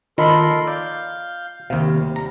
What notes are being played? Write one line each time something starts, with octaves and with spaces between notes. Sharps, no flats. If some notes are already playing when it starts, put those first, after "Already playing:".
D#3 F4 A4 A#4 D#5 B5 C6
D5 F5 G6
D#2 C3 G3 F5
A#5